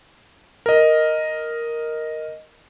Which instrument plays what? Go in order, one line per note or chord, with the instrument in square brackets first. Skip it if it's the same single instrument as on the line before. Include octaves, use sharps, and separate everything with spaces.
[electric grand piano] A#4 D#5